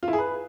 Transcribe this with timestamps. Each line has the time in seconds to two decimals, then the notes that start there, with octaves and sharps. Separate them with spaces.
0.03 F4
0.08 E4
0.13 G#4
0.18 B4